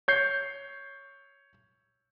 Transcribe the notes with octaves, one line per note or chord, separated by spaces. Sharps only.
C#5 G6 C7